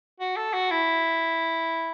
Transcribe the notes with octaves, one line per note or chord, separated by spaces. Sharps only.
F#4
A4
F#4
E4